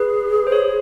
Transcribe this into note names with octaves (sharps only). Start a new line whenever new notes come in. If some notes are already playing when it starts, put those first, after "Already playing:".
Already playing: G#4 B4
C5
C#5